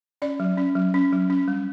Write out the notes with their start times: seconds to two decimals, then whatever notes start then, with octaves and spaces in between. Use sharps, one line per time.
0.22 C#4 D5
0.40 F#3
0.57 C#4
0.76 F#3
0.94 C#4
1.12 F#3
1.30 C#4
1.48 G3